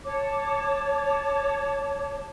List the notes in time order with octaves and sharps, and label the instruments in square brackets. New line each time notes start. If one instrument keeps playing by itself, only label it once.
[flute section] C#5 A5 D6